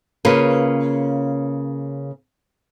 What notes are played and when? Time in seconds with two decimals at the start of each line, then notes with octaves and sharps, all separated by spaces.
0.25 C#3 A#3 F4 B4